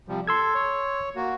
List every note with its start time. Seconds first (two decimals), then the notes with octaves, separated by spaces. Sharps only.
0.08 C3 F3 G3
0.27 A4 C6 E6 G#6
0.55 C#5
1.16 A#3 F#4